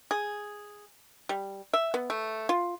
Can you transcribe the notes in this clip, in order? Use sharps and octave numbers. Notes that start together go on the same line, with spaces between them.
G#4
G3
E5
B3
A3
F4